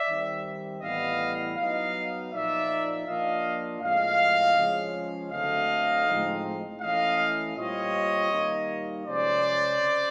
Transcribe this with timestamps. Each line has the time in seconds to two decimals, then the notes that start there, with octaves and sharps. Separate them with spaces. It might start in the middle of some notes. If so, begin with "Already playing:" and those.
Already playing: D5 E5
0.08 D#3 G3 C4
0.82 A2 E3 G3 B3 E4 D#5 F5
1.57 F#3 B3 D#4 D#5 F5
2.31 A#2 F3 A#3 D#4 D5 E5
3.06 F3 A#3 D4 F4 D#5 F5
3.81 A2 F3 G#3 C4 D#5 F5
4.56 C#3 F3 G#3 C#4
5.31 D3 F#3 A3 C4 D#5 F5
6.07 A2 F3 G#3 C4 D#4
6.81 E3 A3 C#4 E4 D#5 F5
7.56 A#2 G3 C4 F4 C#5 D#5
8.30 D#3 G3 A#3 D#4
9.05 C3 F3 G#3 C#4 C5 D5
9.80 C#3